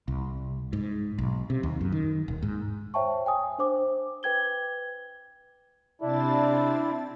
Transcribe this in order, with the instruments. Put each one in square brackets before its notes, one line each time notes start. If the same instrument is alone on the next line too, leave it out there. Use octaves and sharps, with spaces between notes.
[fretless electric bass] C2
G#2
B1
C3
D#2
F#2
D#3
D#1
G#2
[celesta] C5 C#5 E5 G5 A5 C#6
G5 G#5 D#6
D4 C5 D6
B4 G5 G#6 G7
[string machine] C3 C4 A6 [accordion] D4 E4